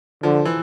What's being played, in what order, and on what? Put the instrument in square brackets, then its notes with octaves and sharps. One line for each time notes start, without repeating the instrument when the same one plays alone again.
[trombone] D3 [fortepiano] F3
[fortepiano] E3